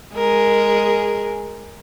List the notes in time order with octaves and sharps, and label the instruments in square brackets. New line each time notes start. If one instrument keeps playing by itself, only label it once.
[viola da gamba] G#3 G#4 A#4